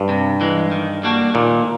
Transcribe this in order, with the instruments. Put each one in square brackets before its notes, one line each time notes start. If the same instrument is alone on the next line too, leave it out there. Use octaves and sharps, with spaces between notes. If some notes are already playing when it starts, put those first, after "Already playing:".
Already playing: [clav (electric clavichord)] G2
[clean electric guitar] C3
E3 G#3
D#3
G3 A#3 D4 F#4
[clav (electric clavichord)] A#2 [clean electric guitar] D#3